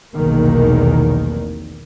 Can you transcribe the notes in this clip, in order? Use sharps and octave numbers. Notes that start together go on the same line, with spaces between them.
F1 B1 E2 B2 D#3 A#3